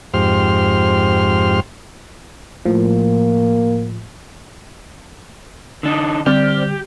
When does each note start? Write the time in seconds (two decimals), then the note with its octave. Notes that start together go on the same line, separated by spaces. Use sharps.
0.14 F2 G#2 G4 C5 C6 F6
2.65 A2 F3 A#3
5.83 D3 D4 D#4
6.26 D3 G3 C4 G4 D5 F6